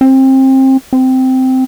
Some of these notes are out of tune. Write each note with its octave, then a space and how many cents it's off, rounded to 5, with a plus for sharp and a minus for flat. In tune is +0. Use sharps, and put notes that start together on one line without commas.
C4 +25
C4 -10